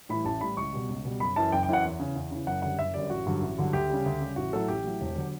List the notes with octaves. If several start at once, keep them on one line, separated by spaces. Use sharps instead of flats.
A2 E3 G3 B5
A1 A5
A2 E3 G3 B5
C#2 C#6
B2 G3
C#2
B2 G3
F#1 B5
F#2 E3 A5
F#1 G5
G5
F#2 E3 F#5
E2
C#3 E3
E2
C#3 E3
F#1 F#5
F#2 D3 G3 F#5
F#1 E5
F#2 D3 G3 D5
A1 F#4
G2 D3 F#3
A1
G2 D3 F#3
D2 G4
C#3 G3
D2
C#3 G3
A1 F#4
A2 F#3 A4
A1 G4
A2 F#3
E1
D3 F#3